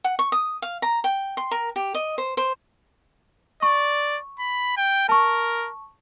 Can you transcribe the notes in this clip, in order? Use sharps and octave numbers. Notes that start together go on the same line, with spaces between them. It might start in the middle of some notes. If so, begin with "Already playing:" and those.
F#5
C#6
D#6
F5
A#5
G5
C6
A#4
G4
D#5
C5
C5
D5 C#6
B5
G5
A#4 A5 C#6